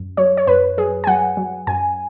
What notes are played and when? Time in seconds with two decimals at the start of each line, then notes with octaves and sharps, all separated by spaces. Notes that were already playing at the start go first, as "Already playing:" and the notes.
Already playing: F#2
0.17 F#3 C#5
0.37 C#5
0.47 F#2 B4
0.78 F#3 G#4
1.04 G#5
1.07 F#3 F#5
1.37 F#3
1.67 F#2 G#5